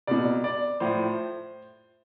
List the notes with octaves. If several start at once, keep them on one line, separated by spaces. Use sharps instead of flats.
C2 B2 D5
D5
A2 F3 C5